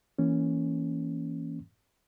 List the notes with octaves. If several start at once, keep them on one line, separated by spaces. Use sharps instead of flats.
E3 A#3 C#4